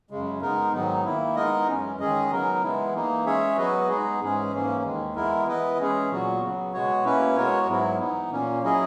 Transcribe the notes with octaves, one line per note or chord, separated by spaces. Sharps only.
F#2 C#3 G#3
G#3 B3 D#4 A#4
G#2 D#3 F#3 B3 D#4
D#3 A#3 E4
G#3 B3 D#4 A#4 D#5
F#2 E3 G#3 C#4
D#3 G#3 C#4 G#4 D#5
C#3 F#3 B3 D#4 A#4
E3 G#3 B3 E4
E3 A#3 D#4
G#3 C#4 G#4 C#5 E5
F#3 B3 F#4 B4 D#5
G#3 B3 D#4 G#4
G#2 E3 G#3 C#4 G#4
G#2 E3 A#3 C#4
D#2 D#3 G#3
E3 G#3 B3 E4 A#4
E3 B3 E4 B4 D#5
E3 G#3 C#4 G#4
A#2 F#3 B3 F#4
C#3 F#3 B3
B2 G#3 B3 F#4 C#5
B2 A#3 C#4 E4 B4
G#3 B3 F#4 A#4 C#5
G#2 F#3 B3 E4
E3 B3 D#4
A#2 A#3 C#4
F#3 C#4 E4 G#4 D#5